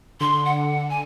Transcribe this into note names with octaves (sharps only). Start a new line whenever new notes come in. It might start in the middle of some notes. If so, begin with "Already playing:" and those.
D3 C6
F#5
G#5